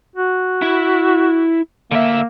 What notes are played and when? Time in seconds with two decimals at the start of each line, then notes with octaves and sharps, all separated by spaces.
0.16 F#4
0.62 E4
1.91 D3 A#3 E5